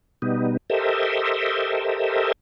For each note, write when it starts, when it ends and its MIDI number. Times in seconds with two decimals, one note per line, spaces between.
0.22 0.57 47
0.22 0.57 55
0.22 0.57 59
0.22 0.57 63
0.70 2.32 67
0.70 2.32 69
0.70 2.32 70
0.70 2.32 72
0.70 2.32 75
0.70 2.32 76